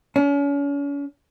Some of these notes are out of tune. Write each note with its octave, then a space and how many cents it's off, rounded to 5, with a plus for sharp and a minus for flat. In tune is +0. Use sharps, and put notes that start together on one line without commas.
C#4 +40